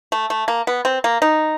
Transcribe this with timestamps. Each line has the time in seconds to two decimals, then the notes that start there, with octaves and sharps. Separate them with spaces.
0.12 A3
0.30 A3
0.48 A#3
0.67 B3
0.85 C4
1.04 A#3
1.22 D#4